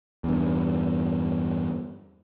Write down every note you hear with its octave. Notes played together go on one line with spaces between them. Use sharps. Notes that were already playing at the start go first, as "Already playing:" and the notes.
E2 G2